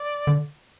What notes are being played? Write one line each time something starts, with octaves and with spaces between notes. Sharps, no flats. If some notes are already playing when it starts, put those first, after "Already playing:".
Already playing: D5
D3